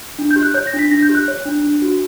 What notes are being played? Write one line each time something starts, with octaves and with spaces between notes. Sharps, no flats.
D4
G6
G4
F#6
C#5 G6
A#6
D4
B6
D4 A#6
G6
G4
F#6
C#5
D4
D4
F#4